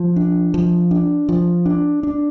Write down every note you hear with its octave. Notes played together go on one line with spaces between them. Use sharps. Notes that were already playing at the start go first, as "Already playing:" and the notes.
Already playing: F3
D4
F3
D4
F3
D4
D4